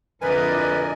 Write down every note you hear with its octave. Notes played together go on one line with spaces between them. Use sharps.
F2 D3 E4 A#4 B4 D5 D#5 G#5